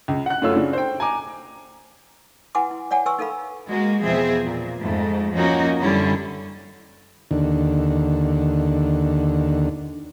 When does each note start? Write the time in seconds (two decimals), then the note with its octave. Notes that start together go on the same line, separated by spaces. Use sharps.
0.08 C#2
0.26 F#5 F#6
0.42 F#2 A3 F4 C#5 E6
0.55 C#3 D4
0.73 C5 G5
1.00 G#5 A#5 D6
2.55 E4 B4 F#5 G#5 C6 D6
2.71 E4
2.91 C#5 D5 F#5 G#5
3.06 B4 G#5 C6 C#6 E6
3.19 D#4 A4 A#4 F5 B5
3.70 G#3 A#3 F#4
4.04 E2 B2 F3 C4 G#4 E5
4.46 A#2
4.79 F2 G#2 A3
5.34 F3 A#3 C#4 D#4 F#4
5.81 F#2 D3 G3 C#4 E4
7.31 D#2 D3